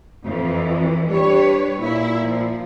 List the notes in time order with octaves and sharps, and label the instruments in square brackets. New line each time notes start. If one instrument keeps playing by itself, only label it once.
[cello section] F2 E3
[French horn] G3 [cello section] D4 B4 C#5
[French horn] A#2 [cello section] E4
[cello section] F3